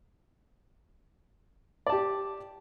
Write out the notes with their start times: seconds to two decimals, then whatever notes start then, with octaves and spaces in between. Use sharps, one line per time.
1.87 D5
1.89 A5
1.92 G4